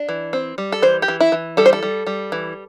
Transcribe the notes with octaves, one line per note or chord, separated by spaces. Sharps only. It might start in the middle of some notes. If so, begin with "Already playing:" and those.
Already playing: D4
E3
C4
G3
A4
E3 C5
G4
E3
E4
E3
G3 A4
C5
A4
G3
G3
E3